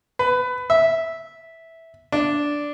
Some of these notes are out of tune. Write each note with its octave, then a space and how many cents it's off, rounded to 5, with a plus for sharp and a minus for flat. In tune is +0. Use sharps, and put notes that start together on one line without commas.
B4 +20
E5 -10
D4 -5